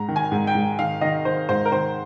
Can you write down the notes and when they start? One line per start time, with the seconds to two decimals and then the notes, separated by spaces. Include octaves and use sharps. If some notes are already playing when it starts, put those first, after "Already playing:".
Already playing: G#2 A#5
0.09 D#3
0.16 G#5
0.32 G#2
0.47 G5
0.55 G#2
0.79 D#3 F5
1.01 D#3 D#5
1.25 D#3 C5
1.49 G#2 C5
1.66 A#4
1.72 D#3 C5